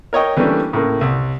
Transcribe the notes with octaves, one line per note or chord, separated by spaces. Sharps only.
A#4 C#5 D#5 G5
E3 G3 A3 A#3 C#4 D4
A2 C#3 A#3
C2